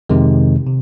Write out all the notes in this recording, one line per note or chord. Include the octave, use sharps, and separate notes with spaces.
F2 C3 D#3 G#3
C3